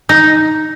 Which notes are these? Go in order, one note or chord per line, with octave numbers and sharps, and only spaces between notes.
D#4